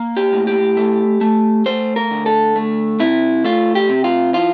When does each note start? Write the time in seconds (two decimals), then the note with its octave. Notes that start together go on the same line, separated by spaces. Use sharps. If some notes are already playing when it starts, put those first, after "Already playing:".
Already playing: A#3
0.16 G4
0.32 A2
0.47 G4
0.77 A3
1.21 A3
1.66 A3 C5
1.96 A#4
2.11 D3
2.26 A4
2.56 A3
3.00 C3 E4
3.44 A3 F4
3.75 G4
3.89 C3
4.04 F4
4.34 E3 F4